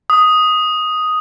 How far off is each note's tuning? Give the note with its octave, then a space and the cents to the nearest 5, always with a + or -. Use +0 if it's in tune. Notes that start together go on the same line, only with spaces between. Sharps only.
D#6 +5